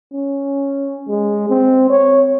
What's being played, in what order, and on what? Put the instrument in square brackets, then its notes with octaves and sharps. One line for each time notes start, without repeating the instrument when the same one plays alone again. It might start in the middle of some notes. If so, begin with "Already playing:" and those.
[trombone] C#4
G#3
C4
C#5